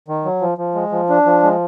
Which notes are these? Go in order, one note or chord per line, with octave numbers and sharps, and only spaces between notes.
D#3
F#3
F3
F3
G#3
F3
D4
F3
G#3